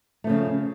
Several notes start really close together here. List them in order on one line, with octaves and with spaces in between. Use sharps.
A3 F3 C#3